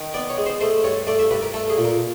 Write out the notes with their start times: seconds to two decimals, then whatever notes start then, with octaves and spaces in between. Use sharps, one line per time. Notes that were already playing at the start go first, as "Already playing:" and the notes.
Already playing: D#3
0.14 B3 D5
0.29 C#5
0.38 G#3
0.46 C5
0.61 A3 C5
0.84 G2 C#5
1.07 A3 D5
1.19 E5
1.31 G2 B4
1.42 A#4
1.54 A3 A4
1.70 G#4
1.78 A#2
1.85 A#4